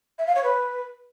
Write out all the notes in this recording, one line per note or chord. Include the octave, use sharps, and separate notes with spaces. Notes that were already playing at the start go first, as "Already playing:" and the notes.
E5
F5
C#5
B4